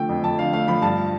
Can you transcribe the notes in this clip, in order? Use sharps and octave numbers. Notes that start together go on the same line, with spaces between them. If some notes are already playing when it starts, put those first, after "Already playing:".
Already playing: D3 F3 A3 G5
F2
F2 A5
D3 F5
A3 F5
F3 B5
G2 A5